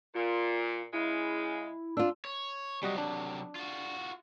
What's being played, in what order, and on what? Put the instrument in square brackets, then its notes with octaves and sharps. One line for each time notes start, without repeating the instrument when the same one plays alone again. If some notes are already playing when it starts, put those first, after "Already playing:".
[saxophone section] A#2 [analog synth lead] F4
[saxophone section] C#3 G#3 [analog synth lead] E4
[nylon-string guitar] D4 F4 [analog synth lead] E6
[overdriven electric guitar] C#5
[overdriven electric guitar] C3 F#3 [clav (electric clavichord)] G3 F#4 D#5
[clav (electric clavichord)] D4
[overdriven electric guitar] F4 F#4